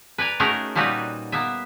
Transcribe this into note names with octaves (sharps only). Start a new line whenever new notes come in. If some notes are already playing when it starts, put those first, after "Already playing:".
B4 D5 G#5 A#5
A3 C#4 D#4 F#4 G#4 A#4
A#2 G3 A#3 D#4 F#4 B4
A#3 B3 E5